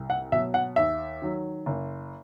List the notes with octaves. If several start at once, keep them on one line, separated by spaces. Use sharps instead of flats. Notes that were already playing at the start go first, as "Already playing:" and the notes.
Already playing: C2
F#5
B2 F#3 E5
F#5
D#2 E5
D#3 F#3
F#1